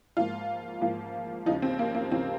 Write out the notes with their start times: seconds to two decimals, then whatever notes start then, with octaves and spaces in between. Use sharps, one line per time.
0.17 G#2 F3 A#3 F4
0.81 G#2 F3 A#3
1.46 D#2 C#3 F3 D#4
1.62 C4
1.79 A#3
1.95 A#3
2.11 D#2 C#3 F3 C4